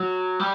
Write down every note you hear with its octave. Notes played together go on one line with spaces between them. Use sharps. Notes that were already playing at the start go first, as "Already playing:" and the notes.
Already playing: F#3
G3